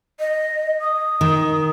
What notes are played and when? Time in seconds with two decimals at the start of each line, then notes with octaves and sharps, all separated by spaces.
0.20 D#5
0.81 D#6
1.21 D#3